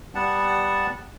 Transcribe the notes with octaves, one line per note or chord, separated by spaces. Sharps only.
G3 B3 F#5 A5